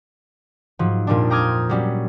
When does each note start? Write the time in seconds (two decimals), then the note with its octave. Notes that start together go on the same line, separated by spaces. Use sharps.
0.79 G#2 F3 F#3
1.07 F2 A#2 F3 G3 D4
1.30 G5 A#5 D6 D#6 F6 G#6
1.69 F#3 G3 C#4